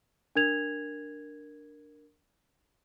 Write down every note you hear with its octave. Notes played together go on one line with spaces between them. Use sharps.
D4 A#4 G#6 F7